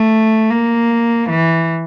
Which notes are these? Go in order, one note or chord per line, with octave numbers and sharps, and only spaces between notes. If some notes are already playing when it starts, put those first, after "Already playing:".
Already playing: A3
A#3
E3